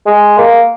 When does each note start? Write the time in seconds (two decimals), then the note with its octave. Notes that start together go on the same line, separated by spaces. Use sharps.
0.06 G#3
0.38 A#3